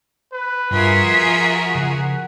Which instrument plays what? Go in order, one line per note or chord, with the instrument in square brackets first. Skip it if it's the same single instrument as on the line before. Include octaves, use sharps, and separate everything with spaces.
[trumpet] B4
[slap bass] G2 [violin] F4 E5 [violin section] F#4 G#4 A#4
[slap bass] F3 [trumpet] F#5
[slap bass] C#3 F3